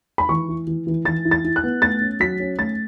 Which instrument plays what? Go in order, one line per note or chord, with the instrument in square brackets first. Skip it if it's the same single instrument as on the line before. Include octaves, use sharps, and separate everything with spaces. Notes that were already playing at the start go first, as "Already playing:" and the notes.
[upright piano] B5
E3 C#6
E4
E3
E3
E3 A6
E4
A6
E4
F#6
B3
A3 A6
C#4
F#3 B6
C#4
A3 A6